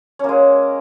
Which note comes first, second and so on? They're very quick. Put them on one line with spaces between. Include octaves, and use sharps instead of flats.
C#4 A#3 G#3